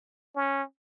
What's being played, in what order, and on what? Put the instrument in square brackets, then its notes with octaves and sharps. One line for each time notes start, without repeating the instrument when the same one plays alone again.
[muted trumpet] C#4